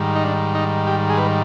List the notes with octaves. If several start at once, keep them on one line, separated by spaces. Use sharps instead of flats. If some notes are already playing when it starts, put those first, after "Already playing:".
Already playing: G#2 D#3 G3
D#4
D4
D#4
G4
G#4
B4